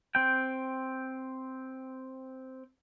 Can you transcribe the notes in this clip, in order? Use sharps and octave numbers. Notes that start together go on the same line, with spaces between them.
C4 G5